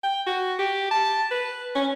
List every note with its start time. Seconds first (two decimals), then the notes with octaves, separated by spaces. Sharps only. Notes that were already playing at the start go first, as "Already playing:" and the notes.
0.03 G5
0.27 F#4
0.59 G4
0.91 A5
1.31 B4
1.75 C#4